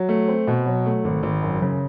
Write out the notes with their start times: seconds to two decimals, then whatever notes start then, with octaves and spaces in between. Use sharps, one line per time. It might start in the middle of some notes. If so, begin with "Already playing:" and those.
Already playing: F#3
0.09 A3
0.28 C4
0.47 B2
0.66 F#3
0.86 A3
1.05 G#1
1.23 G#1
1.42 F#2
1.62 C#3